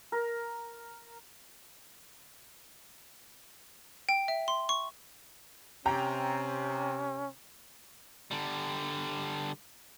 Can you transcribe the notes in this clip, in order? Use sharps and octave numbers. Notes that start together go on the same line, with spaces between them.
A#4
G5
E5
C6
C#6
C3 C#4 G5 A#5
D3 G3